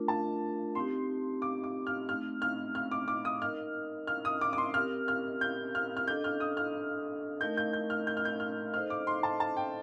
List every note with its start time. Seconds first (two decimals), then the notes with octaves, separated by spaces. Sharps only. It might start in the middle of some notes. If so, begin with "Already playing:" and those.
Already playing: A3 D4 F4 A#4
0.08 A5
0.75 C4 D#4 G4 C6
1.42 D6
1.64 D6
1.87 F6
2.08 A3 C4 D#4 F6
2.42 F6
2.75 F6
2.91 D6
3.08 D6
3.25 D#6
3.41 D#4 A#4 D#5 F6
4.07 F6
4.25 D#6
4.41 D6
4.53 D6
4.58 C6
4.74 C4 G4 A#4 F6
5.08 F6
5.41 G6
5.75 F6
5.97 F6
6.08 D4 A4 D#5 G6
6.24 F6
6.40 D#6
6.57 F6
7.41 A3 D#4 A#4 D#5 G6
7.57 G6
7.73 G6
7.90 F6
8.07 G6
8.17 F6
8.25 G6
8.40 F6
8.74 D#4 A4 C5 D#5 F6
8.90 D6
9.07 C6
9.23 A5
9.40 A5
9.57 G5